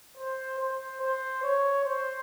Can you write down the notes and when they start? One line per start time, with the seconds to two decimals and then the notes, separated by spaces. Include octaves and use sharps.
0.18 C5
0.59 C5
1.01 C5
1.43 C#5
1.85 C5